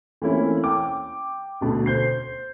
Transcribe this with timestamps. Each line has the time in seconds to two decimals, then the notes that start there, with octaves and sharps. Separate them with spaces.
0.22 E3 A3 A#3 C4 C#4 E4
0.64 G5 D6
1.61 D2 B2 D3
1.86 C5 G6 C7